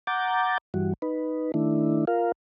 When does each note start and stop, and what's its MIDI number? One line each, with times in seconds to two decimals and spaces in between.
0.07 0.58 78
0.07 0.58 82
0.07 0.58 86
0.07 0.58 91
0.07 0.58 93
0.74 0.94 43
0.74 0.94 52
0.74 0.94 55
0.74 0.94 66
1.02 1.52 63
1.02 1.52 71
1.54 2.05 51
1.54 2.05 57
1.54 2.05 62
1.54 2.05 64
2.07 2.32 65
2.07 2.32 70
2.07 2.32 77